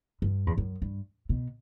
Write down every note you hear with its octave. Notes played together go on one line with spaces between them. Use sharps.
G2
E2
F#2
G2
B2